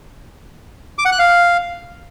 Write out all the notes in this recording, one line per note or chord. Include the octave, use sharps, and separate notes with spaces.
D6
F#5
F#6
F5